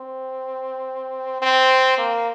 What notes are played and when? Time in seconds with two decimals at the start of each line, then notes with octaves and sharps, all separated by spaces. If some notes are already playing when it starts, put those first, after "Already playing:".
Already playing: C4
1.42 C4
1.98 A#3